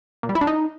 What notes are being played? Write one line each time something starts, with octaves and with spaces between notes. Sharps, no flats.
A#2
G3
E4
D4
D#4